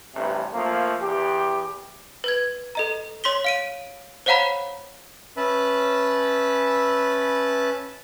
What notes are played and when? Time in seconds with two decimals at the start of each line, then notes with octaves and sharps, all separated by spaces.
0.15 A1 G2 C3
0.54 F3 A3 A#3
1.02 E2 G4
2.24 B4 G#6
2.75 A4 D#5 A#5
3.24 C#5 C6 B6 G7
3.44 F5 D7 D#7
4.26 C5 C#5 F5 F#5 A#5 B5
5.37 C#4 B4 E5 A5 B5